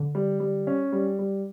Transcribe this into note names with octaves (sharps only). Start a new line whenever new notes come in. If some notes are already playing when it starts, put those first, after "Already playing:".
Already playing: D3
G3
G3
C#4
G3
G3